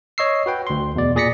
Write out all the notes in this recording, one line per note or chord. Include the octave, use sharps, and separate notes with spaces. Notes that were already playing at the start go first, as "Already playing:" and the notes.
C#5 D#5 C#6 E6 C7
F#4 B4 G5
D2 C6
E2 B2 D5
A#2 G#4 D5 A#6 B6 C#7